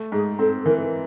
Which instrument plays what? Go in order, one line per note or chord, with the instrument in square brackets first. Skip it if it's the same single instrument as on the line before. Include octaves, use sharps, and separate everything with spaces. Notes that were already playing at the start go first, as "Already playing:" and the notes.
Already playing: [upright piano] A3
[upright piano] G#2 [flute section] G#4
[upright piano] C4 [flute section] A4
[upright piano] E3 [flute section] A#4